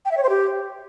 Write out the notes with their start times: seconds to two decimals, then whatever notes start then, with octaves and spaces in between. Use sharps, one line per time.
0.05 G5
0.11 E5
0.17 C#5
0.23 C5
0.29 G4